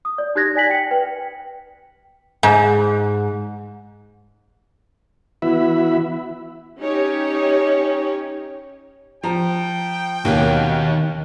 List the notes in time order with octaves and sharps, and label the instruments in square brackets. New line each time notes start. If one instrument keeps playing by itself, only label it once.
[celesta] D#6
D5
D#4 G4 F#6 G#6 A#6
D5 G#5 B6 F#7
G5 C#7
B4 G5
[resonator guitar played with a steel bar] G#2
[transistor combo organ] E3 B3 E4 F#4 E5 B5
[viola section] C#4 D#4 G4 C#5
[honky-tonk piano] F3 A#5 [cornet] G5
[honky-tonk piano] D#2 [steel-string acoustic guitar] B2 A#3 C#4 [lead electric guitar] D#3